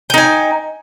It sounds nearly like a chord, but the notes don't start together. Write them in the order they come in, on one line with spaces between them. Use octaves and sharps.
G5 D#4 G#5